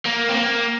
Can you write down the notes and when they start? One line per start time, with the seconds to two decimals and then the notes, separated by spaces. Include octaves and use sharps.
0.06 A#3
0.29 C4
0.37 A#3